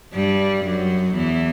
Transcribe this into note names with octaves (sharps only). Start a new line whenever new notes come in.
G2 G3
F#2 F#3
E2 E3